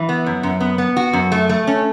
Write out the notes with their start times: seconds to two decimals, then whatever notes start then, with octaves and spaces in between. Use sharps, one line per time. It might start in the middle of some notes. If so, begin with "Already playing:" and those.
Already playing: E3
0.09 B3
0.26 F#2
0.43 F#2
0.60 B3
0.78 B3
0.97 F#4
1.13 F#2
1.32 A3
1.49 A3
1.67 C#4